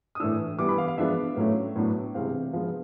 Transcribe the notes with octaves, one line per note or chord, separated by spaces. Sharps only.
D#6
A2 E3 A3 D4 E6
E3 G3 B3 D6
B5
F5
F5
F3 G#3 B3 D4 E5
A2 F#3 A3 C#4
A2 F#3 B3 D4
C3 E3 G#3 C4 F5
F3 G#3 B3 D4 F5